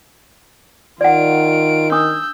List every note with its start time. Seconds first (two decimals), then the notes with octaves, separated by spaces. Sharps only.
1.01 D#3 F4 D5 F#5 D7
1.92 D4 D#6 E6 G6